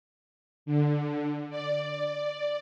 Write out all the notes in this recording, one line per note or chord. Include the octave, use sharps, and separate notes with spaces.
D3
D5